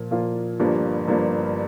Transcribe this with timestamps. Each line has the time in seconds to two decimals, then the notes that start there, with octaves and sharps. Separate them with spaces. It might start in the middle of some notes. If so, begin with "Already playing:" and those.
Already playing: A#2 F3 A#3 F4
0.11 A#2 F3 A#3 F4
0.60 G1 G2 F3 A#3
1.08 G1 G2 F3 A#3